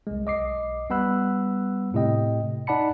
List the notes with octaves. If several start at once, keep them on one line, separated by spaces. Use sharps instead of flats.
C2 G#3
B1 D#5 D6 C7
G3 B3 F#5 B5 E6 F#6
A2 C3 D#5 G5
D#4 D5 F#5 A5 B5 C#7